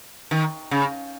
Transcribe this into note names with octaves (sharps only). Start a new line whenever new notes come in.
D#3
C#3